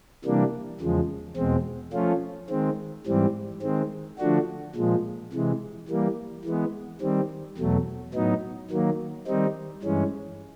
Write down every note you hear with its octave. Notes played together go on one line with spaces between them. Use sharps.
C3 E3 G3 A#3 D4
E2 C#3 F3 G#3
E2 B2 G#3 C4
F3 A3 C#4 F4
D#3 G#3 C4
G#2 E3 G3 C4
D#3 G#3 C4
D3 F3 A3 D4 F#4
A#2 F3 G#3
C3 E3 G#3
E3 G3 A#3
E3 G#3 B3
D#3 G3 C4
E2 B2 F#3 A3
A2 F#3 B3 D#4
D#3 F#3 A#3
D#3 G3 C4 D#4
G2 E3 G#3 C#4